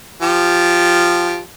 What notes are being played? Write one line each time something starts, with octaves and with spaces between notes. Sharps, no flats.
F3 G4